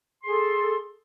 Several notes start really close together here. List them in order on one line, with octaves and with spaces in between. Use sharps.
C6 G#4 A4